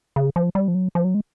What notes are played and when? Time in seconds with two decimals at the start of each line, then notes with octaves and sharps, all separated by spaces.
0.16 C#3
0.36 F3
0.55 G3
0.68 F3
0.75 F#3
0.95 F3
1.05 F#3
1.14 G#3